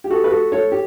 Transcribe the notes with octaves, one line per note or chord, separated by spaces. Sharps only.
G4
F#4 A4
B4
F#4 A4
A4 C#5
G4